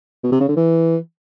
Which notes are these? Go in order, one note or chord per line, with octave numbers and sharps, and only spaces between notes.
B2
C3
C#3
D3
E3